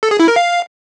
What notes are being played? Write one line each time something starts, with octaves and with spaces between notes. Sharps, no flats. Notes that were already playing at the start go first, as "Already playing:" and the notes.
A4
G#4
E4
A#4
F5